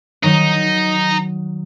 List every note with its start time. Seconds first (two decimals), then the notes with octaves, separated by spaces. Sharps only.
0.23 D#3 F#3 D#4